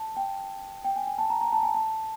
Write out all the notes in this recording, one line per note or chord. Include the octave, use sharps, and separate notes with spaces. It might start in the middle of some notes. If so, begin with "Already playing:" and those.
Already playing: A5
G5
G5
G#5
G#5
A5
A#5
A#5
A5
G#5
A5